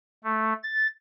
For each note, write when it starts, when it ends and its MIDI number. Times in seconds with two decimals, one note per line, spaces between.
0.24 0.53 57
0.63 0.87 93